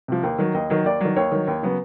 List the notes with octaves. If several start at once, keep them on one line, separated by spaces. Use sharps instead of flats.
C3 F3
D#2
D#3 F#3
D#2 D#5
D#3 F#3
D#2 D5
D#3 F#3
D#2 C#5
D#3 F#3
D#2
C#3 F#3 B3